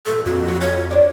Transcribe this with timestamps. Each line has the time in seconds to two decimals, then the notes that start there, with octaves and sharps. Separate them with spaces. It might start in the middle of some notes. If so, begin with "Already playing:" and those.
0.06 E2 G2 A#2 A4
0.26 F2 F#4
0.48 F#3
0.61 C#5
0.91 D4 C#5 D5